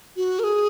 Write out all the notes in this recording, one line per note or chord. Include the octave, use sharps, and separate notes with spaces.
F#4
A#4
G#4